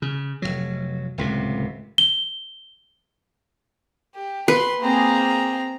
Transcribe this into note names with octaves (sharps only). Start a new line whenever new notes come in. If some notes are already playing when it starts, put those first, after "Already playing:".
C#3
F1 C2 F#3
D1 C#2 C3
G7
G4
B4 C6
A#3 C4 G#4 A#5